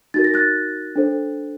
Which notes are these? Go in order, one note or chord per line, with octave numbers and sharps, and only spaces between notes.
D#4 F#4 A#4 A6
A#6
F#6 A6
D4 A4 C5